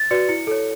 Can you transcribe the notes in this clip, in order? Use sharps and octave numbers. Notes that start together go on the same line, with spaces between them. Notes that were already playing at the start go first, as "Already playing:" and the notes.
Already playing: A6
F#4 B4 D5 C#7
E4 C#7
A4 C#5